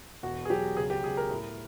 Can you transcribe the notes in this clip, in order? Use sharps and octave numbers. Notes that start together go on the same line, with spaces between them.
E1 F#4
G#4
F#3 G4
C#2 G#4
G4
C#2 G#4
A#4
A2